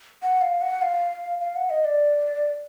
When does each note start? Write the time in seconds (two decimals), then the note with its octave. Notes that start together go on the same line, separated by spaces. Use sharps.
0.23 F#5
0.41 F5
0.61 F#5
0.82 F5
1.41 F5
1.56 F#5
1.70 D#5
1.85 D5